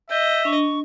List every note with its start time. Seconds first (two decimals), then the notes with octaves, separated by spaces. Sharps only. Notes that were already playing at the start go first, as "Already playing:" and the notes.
0.10 D#5 E5 G6
0.45 D4 C#6